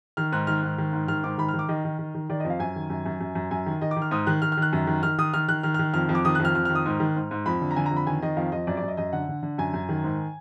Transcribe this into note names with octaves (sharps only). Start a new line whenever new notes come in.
D#3 F6
G#2 F#6
D#3 F6
G#2
D#3
G#2
D#3 F6
G#2 D6
D#3 B5
F6
D#3
D6
D#3 D#5
D#3
D#3
D#3
D#3 D5
F2 D#5
F5
F#2 G#5
D#3
F#2
F#2
F#2
F#2
F#2 G#5
D#3
D#3 D#5
D6
D#3
F6
G#2 D#6
D#3 F#6
D#3 F6
F6
D#3 F#6
F#2
D#3
D#3 F6
D#3 D#6
D#3 F6
D#3 F#6
D#3 F6
D#3 F6
F2 F6
F2
D6
D#3 D#6
F2 F#6
F6
F2 F6
D#3 F6
D#6
G#2
D#3
G#2
G#2
F2 B5
D3
A#5
D3 G#5
A#5
F2
B5
D#3 G#5
D#3 D#5
F2 F5
F2 D#5
F#2 D5
D5
F#2 D#5
F#2 D#5
D3 F#5
D3
D3
F#2 G#5
F#2
D#3
G#2